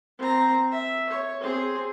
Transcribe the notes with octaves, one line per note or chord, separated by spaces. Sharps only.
C4 A#5
E5
C#5
C4 G#4